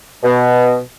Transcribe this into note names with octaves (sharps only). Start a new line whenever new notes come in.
B2